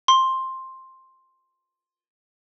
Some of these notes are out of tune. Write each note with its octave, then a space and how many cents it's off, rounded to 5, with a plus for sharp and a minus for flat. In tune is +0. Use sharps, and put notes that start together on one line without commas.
C6 +10